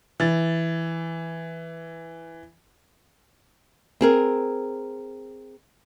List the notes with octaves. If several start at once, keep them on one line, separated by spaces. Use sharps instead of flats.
E3 A6
C4 G#4 A#4